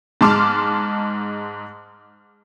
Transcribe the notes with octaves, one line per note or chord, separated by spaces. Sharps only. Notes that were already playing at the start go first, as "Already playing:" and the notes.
G#2 G#3 A5 C6 D6 F6